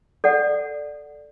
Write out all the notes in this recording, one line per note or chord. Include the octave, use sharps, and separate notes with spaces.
A4 D5 F#5